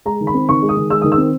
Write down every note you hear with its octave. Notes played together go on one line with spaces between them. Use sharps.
G#3 A#5
D#3
B5
C4
D#3 C#6
G#3
D#6
D#3
G#3 E6
D#3 D#6
E6
C4